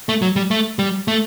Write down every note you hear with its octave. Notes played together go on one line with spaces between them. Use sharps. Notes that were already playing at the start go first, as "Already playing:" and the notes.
A3
F#3
G3
A3
G3
A3